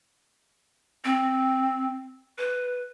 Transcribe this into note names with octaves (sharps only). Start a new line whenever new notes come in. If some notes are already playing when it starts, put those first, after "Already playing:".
C4
B4